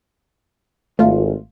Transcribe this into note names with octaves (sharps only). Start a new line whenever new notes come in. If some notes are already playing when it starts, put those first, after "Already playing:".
G#1 A3 F4